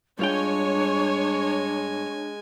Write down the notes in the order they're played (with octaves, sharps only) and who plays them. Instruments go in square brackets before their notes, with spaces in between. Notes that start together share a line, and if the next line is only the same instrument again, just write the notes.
[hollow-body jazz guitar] G2 F4 G5 [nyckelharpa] G#3 G#5 [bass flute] D4 [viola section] C#5